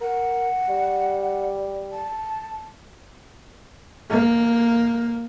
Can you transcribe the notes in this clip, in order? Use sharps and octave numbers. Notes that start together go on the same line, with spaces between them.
A#4 F#5
G3
A5
A#3